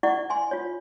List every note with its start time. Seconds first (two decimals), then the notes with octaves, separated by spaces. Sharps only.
0.03 E4 D5 F#5 C#6
0.30 G#5 C6
0.51 F4 C#5